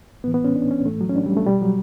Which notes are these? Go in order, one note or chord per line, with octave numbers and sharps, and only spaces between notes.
A2 E3 B3
B3
C#4
D4
C#4
A2 E3 A3
F#3
C#4
D4
G3
A3
B2 G3
F#3